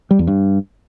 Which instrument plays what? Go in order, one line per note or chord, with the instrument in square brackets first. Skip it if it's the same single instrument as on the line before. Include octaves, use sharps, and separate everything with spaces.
[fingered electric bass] G3
E2
G2